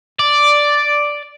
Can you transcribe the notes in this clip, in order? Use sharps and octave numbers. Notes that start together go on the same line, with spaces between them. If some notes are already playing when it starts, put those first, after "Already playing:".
D5